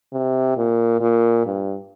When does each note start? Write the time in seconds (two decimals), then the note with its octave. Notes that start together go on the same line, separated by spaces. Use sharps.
0.13 C3
0.57 A#2
1.01 A#2
1.46 G2